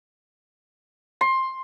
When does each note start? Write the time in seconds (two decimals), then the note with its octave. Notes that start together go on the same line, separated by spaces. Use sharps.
1.21 C6